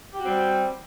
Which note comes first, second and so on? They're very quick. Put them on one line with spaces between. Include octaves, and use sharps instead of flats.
G4 F#4 C4 G3